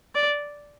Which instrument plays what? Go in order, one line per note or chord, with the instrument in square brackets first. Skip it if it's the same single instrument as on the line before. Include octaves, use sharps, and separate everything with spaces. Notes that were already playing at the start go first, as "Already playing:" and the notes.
[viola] D5